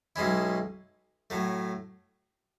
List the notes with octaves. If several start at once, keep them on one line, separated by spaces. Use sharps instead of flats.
B1 B2 G#3 C#4 E4
A2 F#3 A3